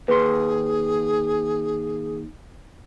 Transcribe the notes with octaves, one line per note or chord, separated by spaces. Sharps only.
D#2 G#4 B4 C6